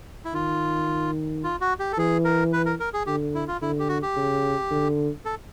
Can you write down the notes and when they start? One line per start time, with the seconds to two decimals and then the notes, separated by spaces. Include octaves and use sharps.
0.25 E4
0.33 D#3 F4
1.44 F4
1.61 F#4
1.79 G4
1.92 A4
1.98 E3 G#4
2.25 A#4
2.53 B4
2.66 A#4
2.80 A#4
2.94 G#4
3.06 D3 G4
3.35 E4
3.48 F4
3.62 D3 E4
3.79 G4
3.89 F#4
4.02 G4
4.16 C#3
4.71 D3
5.25 A4